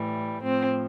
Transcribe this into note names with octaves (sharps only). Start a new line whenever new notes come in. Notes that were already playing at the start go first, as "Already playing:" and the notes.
Already playing: A2 E3 G3
A2 F3 C4